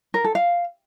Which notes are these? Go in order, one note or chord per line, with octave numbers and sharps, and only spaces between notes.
A#4
A4
F5